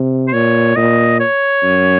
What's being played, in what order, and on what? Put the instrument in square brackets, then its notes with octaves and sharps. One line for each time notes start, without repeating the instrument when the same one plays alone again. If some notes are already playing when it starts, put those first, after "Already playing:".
Already playing: [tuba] C3
[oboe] C5
[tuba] A#2 [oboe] C#5
[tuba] A#2 [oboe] D#5
[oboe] C#5
[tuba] F#2